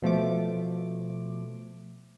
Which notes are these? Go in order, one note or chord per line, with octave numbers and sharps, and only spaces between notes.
B2 F3 A3 D6